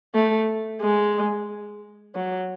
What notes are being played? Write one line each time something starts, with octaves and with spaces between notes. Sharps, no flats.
A3
G#3
F#3